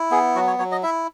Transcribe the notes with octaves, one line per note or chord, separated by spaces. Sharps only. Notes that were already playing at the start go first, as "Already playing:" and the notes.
Already playing: E4
B3 G#4
F#3 F#4
C#5
F#3 C#5
D#5
E4 E5